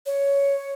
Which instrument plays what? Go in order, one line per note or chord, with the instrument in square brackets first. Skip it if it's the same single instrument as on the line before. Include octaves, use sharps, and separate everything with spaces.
[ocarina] C#5